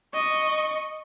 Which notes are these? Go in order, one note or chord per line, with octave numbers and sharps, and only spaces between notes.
D#5 C#6